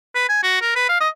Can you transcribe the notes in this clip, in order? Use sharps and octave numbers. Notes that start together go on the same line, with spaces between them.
B4
G#5
F#4
A#4
B4
F5
D#5